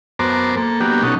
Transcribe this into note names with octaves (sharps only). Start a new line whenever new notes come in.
F#2 B3 A#4 C5 A5 D6
A#3 A4
F#3 A#3 B3 D4 G4
B2 F#3 C#4 D#4 A4